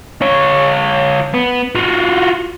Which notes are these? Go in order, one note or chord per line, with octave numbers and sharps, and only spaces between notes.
F4 C#5
B3
F4 F#4